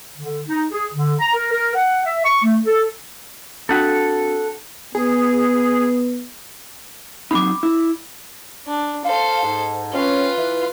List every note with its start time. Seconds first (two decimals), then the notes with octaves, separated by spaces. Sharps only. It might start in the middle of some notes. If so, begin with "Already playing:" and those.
0.18 D3
0.48 D#4
0.72 G#4
0.93 D3
1.20 A#5
1.34 A#4
1.52 A#4
1.75 F#5
2.05 E5
2.25 C#6
2.44 A3
2.65 A4
3.69 C4 D4 F#4 A4 F#5
4.95 B3 G#4
7.31 F#3 C4 D#4 B5 D6
7.63 E4
8.67 D4
9.05 A4 C5 F5
9.42 G#2
9.93 C4 C#4 F4 B4
10.38 E3